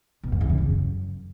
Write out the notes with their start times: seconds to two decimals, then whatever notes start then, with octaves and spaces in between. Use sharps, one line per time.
0.23 B2
0.32 F#2
0.41 E2
0.49 C#3
0.58 F#2